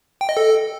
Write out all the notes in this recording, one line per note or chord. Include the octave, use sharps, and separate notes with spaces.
G5
D#5
A4